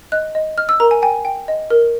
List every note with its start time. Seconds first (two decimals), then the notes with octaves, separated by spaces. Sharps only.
0.12 D#5 F#6
0.35 D#5
0.58 D#5 F6
0.69 E6
0.80 A#4 A#5
0.91 G#5
1.02 G5 G#5
1.25 G5
1.48 D#5
1.70 A#4